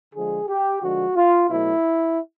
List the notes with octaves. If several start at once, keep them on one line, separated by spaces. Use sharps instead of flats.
D3 F3 G#3 G#4
G4
D3 F3 G#3 F#4
F4
B2 F#3 A3 E4